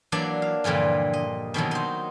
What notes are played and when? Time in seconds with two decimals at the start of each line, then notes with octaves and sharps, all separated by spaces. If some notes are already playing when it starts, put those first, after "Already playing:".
0.12 E3 F#3 A#3 D4 D5
0.42 F5
0.64 G2 A#2 D3 E3 F3
1.13 D#5
1.54 B2 D#3 E3 F#3
1.71 D#4 C5